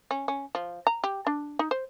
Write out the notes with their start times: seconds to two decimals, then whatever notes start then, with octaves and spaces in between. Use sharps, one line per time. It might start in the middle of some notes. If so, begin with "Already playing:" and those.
0.11 C#4
0.28 C#4
0.55 F3
0.87 A#5
1.04 G4
1.27 D4
1.59 D#4
1.71 C5